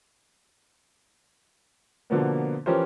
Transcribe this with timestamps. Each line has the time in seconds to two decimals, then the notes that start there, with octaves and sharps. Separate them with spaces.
2.10 B2 D3 F3 A#3 B3
2.66 E3 F3 C#4 G4 A#4 C5